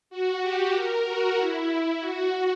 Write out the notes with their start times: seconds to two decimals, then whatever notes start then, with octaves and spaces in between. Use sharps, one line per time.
0.10 F#4
0.42 G4
0.74 A#4
1.06 F#4
1.38 E4
2.00 F#4